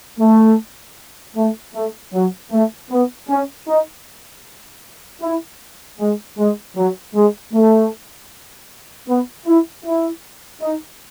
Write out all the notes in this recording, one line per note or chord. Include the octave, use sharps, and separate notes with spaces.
A3
A3
A3
F#3
A3
B3
C#4
D#4
E4
G#3
G#3
F#3
G#3
A3
B3
E4
E4
D#4